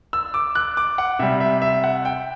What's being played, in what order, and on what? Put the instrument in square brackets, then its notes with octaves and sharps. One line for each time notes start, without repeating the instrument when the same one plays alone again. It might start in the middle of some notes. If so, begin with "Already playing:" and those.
[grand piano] E6
D6
F#6
D6
F#5
C3 G3 E5
E5
E5
F#5
G5